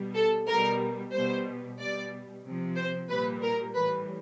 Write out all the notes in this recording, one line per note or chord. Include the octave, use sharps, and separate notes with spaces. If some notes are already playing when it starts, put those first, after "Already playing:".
Already playing: B2 G3
A4
B2 G3 A#4
B2 G3 C5
B2 G3 D5
C3 F3
C5
A#2 G3 B4
A#4
A2 E3 G3 B4